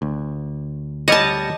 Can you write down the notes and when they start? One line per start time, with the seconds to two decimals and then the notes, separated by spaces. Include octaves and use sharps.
0.02 D2
1.08 G3 C#5 D#5 F#5 A5